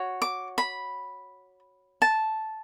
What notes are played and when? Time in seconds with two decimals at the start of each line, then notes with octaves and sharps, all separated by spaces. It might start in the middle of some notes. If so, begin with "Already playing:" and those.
Already playing: F#4 C#5
0.22 D6
0.58 B5
2.02 A5